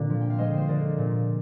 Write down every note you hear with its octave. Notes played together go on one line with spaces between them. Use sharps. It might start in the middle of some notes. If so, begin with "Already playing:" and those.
Already playing: A#2 D3 C4
F3
G5
F5
G#3 C5 D#5
C5
D3 A#4 D5
A#2